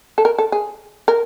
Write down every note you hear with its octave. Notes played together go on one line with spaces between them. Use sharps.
A4
A#4
A4
G#4
A#4